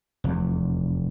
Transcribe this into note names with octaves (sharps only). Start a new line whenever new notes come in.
F1 E2